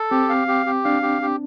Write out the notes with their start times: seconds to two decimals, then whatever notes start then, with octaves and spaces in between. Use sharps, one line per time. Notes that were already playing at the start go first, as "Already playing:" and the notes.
Already playing: A4
0.11 C4 G4
0.29 F5
0.48 G4
0.66 G4
0.85 D4 F5
1.03 G4
1.22 G4